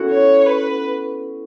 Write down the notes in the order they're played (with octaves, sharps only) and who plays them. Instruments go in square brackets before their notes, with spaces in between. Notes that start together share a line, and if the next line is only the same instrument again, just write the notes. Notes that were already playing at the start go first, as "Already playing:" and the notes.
Already playing: [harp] B3 C#4 E4 F#4 A4
[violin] C#5
B4